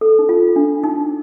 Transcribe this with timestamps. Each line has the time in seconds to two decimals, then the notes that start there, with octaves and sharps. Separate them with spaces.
0.01 A4
0.19 D#4
0.29 F4
0.56 D4
0.84 D#4